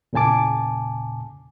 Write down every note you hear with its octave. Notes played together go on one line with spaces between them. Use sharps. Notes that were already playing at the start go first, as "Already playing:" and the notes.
E2 A#2 C#3 G#5 A5 D6